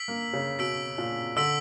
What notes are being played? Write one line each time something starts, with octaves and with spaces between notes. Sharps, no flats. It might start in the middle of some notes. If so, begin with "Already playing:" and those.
Already playing: E6 B6 D7 F#7
A#3
C#3
B2 E6 B6 D7 F#7
A#2
D3 E6 B6 D7 F#7